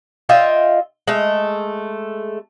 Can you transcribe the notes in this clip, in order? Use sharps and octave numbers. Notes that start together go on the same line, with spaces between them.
F4 D#5 E5 G5
G#3 A3